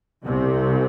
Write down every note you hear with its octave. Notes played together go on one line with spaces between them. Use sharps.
C2 C3